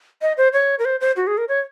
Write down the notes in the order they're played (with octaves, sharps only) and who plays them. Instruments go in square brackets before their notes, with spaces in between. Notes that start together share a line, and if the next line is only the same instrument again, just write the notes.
[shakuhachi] D#5
C5
C#5
A#4
C5
C5
F#4
G#4
A#4
C#5